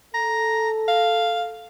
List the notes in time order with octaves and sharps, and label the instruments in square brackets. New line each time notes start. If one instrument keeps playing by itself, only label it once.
[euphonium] A4 [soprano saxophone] A#5
[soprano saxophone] F5